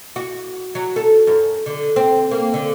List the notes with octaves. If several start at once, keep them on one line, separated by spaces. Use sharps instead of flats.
F#4
F#3
A4
F#2
D3
C4
A#3
D3